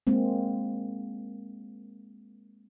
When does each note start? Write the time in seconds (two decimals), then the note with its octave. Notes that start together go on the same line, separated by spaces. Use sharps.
0.07 G#3 A#3 C4